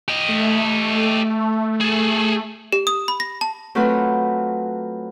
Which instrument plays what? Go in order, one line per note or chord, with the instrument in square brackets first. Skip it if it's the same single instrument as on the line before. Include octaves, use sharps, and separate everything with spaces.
[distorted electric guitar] G4 D#5
[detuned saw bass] A3
[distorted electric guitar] G#4 A4
[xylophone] G4
D#6
B5
A#6
A5
[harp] F#3 A3 C4 F4 B4